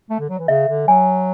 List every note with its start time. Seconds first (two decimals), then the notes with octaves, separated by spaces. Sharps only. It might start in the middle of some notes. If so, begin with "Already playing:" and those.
0.10 A3
0.19 D3
0.29 F#3
0.39 E3
0.48 C#3 E5
0.68 D3
0.88 F#3 G#5